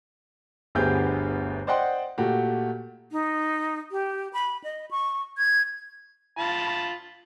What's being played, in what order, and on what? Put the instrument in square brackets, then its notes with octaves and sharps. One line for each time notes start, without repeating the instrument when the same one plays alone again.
[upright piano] G1 D2 B3 G4 G#4 G6
C5 D5 D#5 F#5 G5 C6
A#2 A3 F#4 G4
[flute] D#4
G4
B5
D#5
C#6
G#6
[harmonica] F4 A5 B5